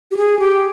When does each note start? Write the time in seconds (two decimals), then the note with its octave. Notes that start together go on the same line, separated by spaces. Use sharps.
0.11 G4
0.17 G#4
0.39 G4